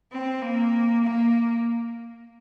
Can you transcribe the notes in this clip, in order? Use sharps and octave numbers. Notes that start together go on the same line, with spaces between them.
C4
A#3
A#3